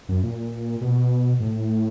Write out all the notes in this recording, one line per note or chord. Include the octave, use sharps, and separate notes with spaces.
F#2
A#2
B2
A2